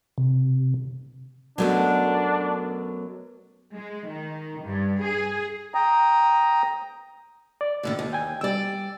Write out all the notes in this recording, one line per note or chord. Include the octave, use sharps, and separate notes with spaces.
C3
F#2 B2 F#3 A3 B3 D4
G#3
D#3
G2
G#4
G5 A#5 D#6
D5
D#2 A2 D3
D#2
G5 G#5
G3 D5 G5 E6